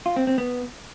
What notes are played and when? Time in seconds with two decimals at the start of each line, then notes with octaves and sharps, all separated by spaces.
0.06 F4
0.16 C4
0.27 C4
0.38 B3